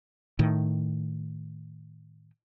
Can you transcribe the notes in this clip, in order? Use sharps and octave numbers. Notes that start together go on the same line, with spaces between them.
A2 D#3